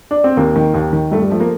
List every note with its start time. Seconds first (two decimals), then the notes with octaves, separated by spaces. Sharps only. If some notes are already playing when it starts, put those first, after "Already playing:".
0.11 D4
0.24 C4
0.37 D#2 A#3
0.56 D#3
0.74 D#2
0.93 D#3
1.12 G2 A3
1.22 G3
1.30 F3 A3
1.40 A#3